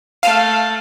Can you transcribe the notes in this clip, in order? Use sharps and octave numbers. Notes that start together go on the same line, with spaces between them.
A3 F5